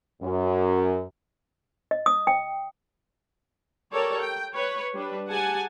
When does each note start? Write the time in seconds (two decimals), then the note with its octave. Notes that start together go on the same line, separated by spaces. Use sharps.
0.22 F#2
1.91 D#5
2.06 D#6
2.27 G5
3.92 G4 A4 A#4 C#5 D5
4.21 G5
4.53 B4 C#5
4.94 G3 D4 B4
5.28 G4 G#4 F#5 G#5 A5